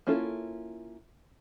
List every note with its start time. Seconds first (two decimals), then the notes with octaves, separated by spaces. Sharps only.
0.07 A#3 C#4 E4 F4 A4